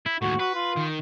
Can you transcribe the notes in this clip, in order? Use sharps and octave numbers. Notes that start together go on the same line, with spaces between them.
E4
D#2 A2 F#4
F#4 B4
F4
D#3